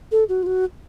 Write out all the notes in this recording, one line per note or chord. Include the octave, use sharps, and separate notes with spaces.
A4
F#4
F4
F#4